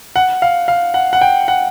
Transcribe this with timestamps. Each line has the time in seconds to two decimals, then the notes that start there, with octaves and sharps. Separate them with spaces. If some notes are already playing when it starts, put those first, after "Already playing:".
0.16 F#5
0.42 F5
0.68 F5
0.94 F#5
1.13 F#5
1.21 G5
1.48 F#5